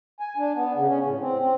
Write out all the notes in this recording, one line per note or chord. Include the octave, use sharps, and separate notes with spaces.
G#5
D4
B3
C#3
C#4
A2
C4
C4